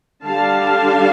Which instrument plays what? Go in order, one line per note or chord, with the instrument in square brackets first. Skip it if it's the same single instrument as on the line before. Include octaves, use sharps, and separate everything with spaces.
[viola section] D3 G3 D4 F5 A5